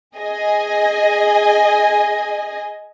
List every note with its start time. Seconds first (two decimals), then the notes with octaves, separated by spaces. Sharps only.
0.17 G#4 D#5 G#5